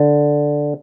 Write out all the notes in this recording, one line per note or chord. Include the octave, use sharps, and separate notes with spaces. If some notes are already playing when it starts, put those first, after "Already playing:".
Already playing: D3